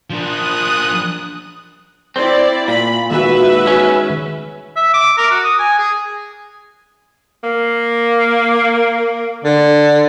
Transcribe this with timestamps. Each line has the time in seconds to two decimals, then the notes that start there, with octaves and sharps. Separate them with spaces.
0.10 F3 D4 D#6 F#6
2.16 C4 E4 D5
2.68 A#2 B5
3.10 D#3 G#3 F#4 B4 E5
3.67 C#4
4.76 E5
4.93 D6
5.17 A#4
5.30 F#4
5.44 D#6
5.59 G#5
5.79 G#4
7.44 A#3
9.45 D3